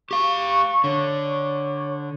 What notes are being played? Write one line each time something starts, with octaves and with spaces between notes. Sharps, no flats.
G4 F5 C#6
D3 C#5